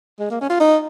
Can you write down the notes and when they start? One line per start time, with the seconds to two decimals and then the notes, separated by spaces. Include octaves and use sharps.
0.20 G#3
0.31 A#3
0.41 C#4
0.50 F4
0.60 D#4